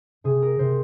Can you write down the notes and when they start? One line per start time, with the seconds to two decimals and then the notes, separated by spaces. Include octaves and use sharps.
0.24 C3 G#4
0.42 A#4
0.59 C3 C5